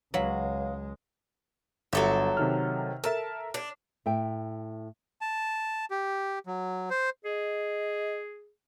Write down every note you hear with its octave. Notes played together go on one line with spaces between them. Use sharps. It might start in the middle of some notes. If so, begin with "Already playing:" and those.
C#2 F#3 G#3 B4 C#5 F5 B5
G1 F#3 A4 E5
C3 D#3 F6
A4 A#4 E5 A5
D4
A2 E5 G5
A5
G4
F#3
C5
G#4 D#5